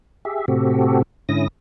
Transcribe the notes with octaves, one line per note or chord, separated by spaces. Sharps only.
G4 G#4 E5
A2 C3 C4 F#4 G4 A4
G#2 D3 C#4 E4 D#6 A#6